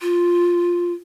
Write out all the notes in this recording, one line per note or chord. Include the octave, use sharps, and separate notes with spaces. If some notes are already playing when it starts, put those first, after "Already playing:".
F4